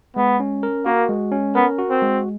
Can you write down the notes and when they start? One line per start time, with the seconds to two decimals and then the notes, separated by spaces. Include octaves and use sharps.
0.16 G#3 B3
0.40 C#4
0.63 A#4
0.85 A#3 F#4
1.09 G#3
1.32 C#4
1.55 B3 A#4
1.78 F#4
1.90 C4
2.02 G#3